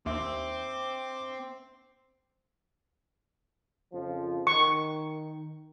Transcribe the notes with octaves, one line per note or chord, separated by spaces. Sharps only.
D#2 C4 D4 E5 D6
F2 C#3 F3
D#3 C#6